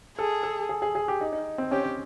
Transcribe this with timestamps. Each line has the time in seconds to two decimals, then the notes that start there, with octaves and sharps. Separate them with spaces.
0.18 G#4 A4
0.43 A4
0.69 G#4
0.82 G#4
0.95 G#4
1.08 G4
1.21 D#4
1.33 D#4
1.58 C4
1.71 C#4 G4
1.84 C#4